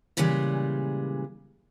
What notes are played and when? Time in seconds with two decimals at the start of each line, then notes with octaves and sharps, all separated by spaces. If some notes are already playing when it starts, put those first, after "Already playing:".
0.17 A#2 C#3 E3 G3 G#3